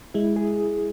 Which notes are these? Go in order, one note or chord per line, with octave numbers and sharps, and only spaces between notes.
G#3 E4
G#4